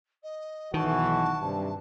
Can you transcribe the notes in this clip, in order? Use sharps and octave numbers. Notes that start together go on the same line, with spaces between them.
D#5
B1 D#3 E3 F#4 A5
G2 C3